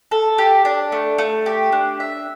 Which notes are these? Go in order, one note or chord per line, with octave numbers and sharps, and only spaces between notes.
A4
G4
D4
A3
A3
G4
D4
E5